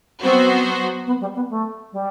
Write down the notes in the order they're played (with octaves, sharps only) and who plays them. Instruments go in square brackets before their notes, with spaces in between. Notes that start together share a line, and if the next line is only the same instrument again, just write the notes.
[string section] F#3 B3 F#4 C5 [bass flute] C4
[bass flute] B3
G3
B3
A3
G3